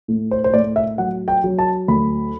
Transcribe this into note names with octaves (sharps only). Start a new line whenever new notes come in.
A2
C5
C5
A2 D5
E5
F#3 F#5
G5
F#3
A5
D2 B5